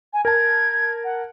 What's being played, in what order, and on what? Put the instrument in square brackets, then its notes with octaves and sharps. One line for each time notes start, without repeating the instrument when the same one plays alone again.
[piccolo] G#5
[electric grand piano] A#4 A5 [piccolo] G#6
[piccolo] F#5